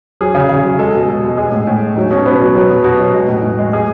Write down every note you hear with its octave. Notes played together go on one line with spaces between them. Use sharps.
F#3 G#4
C#3
C#3
F#3
G#3 A4
B2
B2
G#3
G#3 G#4
A2
A2
G#3
F#3 D#4
B2 C#4
B2 B3
F#3
F#3
B2
B2 F#4
F#3
G#3
A2
A2
G#3
G#3 G#4